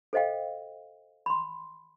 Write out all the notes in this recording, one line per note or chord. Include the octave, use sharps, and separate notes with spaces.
A4 C5 D#5 F5 G5
B5 C6